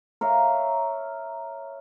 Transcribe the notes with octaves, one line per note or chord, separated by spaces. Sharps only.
A#4 C#5 E5 F5